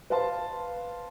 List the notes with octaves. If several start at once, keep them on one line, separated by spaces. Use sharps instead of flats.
B4 C5 F5 A5 C6